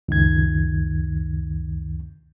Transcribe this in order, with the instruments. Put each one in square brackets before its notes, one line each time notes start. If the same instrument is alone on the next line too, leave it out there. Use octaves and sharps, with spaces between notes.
[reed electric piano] C#2 F#2 D#3 G#6